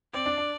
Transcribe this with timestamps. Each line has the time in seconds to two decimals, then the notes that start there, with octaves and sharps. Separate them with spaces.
0.14 C4 D5
0.26 D4
0.38 D4